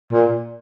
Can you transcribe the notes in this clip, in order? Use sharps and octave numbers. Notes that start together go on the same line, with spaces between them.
A#2